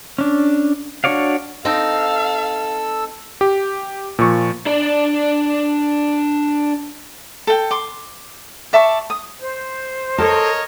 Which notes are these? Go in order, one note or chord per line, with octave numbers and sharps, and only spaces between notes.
C#4 D4
D4 F#4 C#5 D5 F5
C4 D#4 A4 F5 E6
G4
A#2 F3 C#6
D4 D5
A4 G5
C6 D6
D5 E5 A5 C#6
D#6
C5
A4 A#4 C#5 D#5 A5